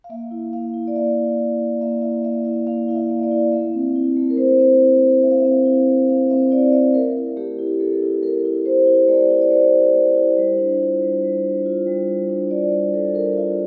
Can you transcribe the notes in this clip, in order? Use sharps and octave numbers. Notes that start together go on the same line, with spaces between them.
F5
A#3 E5
E4
A#3 F5
E4
D5
A#3 E5
E4
A#3
E4
A#3 E5
E4 E5
A#3 E5
E4 E5
A#3 F5
E4 F5
E5
A#3
E5
D5
E4
A3 E5
C4
E4
A3
A#4
A3 C5
C4 C5
E4 C5
A3
A3 E5
F5
C4 E5
E4
A3
A3 F5
C4 E5
E4 D5
A3 E5
A3 A#4
E4
A3 G4
E4
A3 A4
E4
A3 A#4
E4
A3 C5
E4
C5
A3 D5
E4
D5
A3 C5
E4
A3
E4
G3
D4
F4
G3
G3
D4
F4
G3
G3
D4
F4 D5
G3
G3 A4
D4 A#4
F4 E5